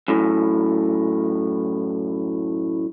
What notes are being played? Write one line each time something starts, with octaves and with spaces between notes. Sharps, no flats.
F#2 A2